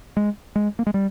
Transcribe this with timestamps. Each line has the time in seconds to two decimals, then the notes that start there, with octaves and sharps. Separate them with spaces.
0.17 G#3
0.56 G#3
0.79 A#3
0.87 G#3
0.94 G3